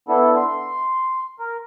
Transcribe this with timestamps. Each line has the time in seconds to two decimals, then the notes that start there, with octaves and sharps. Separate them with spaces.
0.08 B3 D4 E4 A4
0.36 C6
1.39 A#4